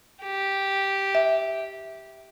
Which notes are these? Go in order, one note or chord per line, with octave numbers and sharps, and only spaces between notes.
G4
E5